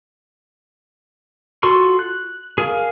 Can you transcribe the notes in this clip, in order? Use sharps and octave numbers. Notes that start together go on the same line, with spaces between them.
F4 F#4 A4 C6 C#6
F#6
G#4 A#4 F5